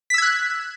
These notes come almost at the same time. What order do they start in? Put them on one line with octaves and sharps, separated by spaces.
B6 E6 G#6 F#6